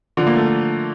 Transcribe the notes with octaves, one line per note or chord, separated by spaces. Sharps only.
D3 F3
A#3
A3